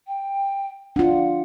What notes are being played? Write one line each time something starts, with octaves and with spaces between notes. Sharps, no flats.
G5
D4 F4 F#5